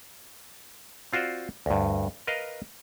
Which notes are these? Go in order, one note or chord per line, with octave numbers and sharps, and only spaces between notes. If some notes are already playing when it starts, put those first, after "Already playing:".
C4 F4 F#4 C5 D5
D2 G2
A#4 B4 D#5 F5